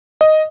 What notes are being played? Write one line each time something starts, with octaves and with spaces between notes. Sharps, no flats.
D#5